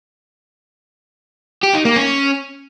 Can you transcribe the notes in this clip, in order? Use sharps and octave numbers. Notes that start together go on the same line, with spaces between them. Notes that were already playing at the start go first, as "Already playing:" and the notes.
G4
D#4
A#3
C#4